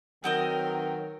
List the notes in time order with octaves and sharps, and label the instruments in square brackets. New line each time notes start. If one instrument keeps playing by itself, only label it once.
[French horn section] D#3 F#3 [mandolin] B3 C4 D#5 [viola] A#4 [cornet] G5